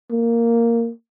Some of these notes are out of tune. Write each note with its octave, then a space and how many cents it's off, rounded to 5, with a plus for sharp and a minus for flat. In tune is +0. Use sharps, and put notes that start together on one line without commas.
A#3 -5